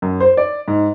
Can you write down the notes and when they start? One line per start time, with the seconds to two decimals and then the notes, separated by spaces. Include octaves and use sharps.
0.02 F#2
0.20 C5
0.37 D5
0.68 G#2